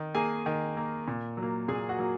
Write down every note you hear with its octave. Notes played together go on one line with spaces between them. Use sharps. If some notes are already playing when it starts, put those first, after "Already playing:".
Already playing: D#3
A#3 G#4 G#5
D#3
A#3
A#2
F#3
A#3
A#2 G#4 G#5
F#4 F#5
F#3 A#3